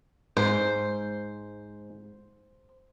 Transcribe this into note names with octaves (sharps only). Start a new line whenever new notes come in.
G#2 C5